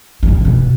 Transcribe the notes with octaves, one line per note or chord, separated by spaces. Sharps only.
D#3
G2
F3
D#3
B2